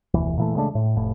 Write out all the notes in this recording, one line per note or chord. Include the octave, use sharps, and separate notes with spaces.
F1 D2 B2 E3
A#2 E3 A3
C#3 G#3 A3 D4
A2
F1 A2